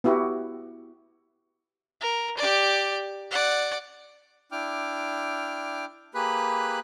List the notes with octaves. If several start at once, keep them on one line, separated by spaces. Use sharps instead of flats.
B3 E4 F#4 G4
A#4
G4 D5
D5 F#5
D4 E4 G5 D6 F6
A#3 G4 G#4 B4 B5 F#6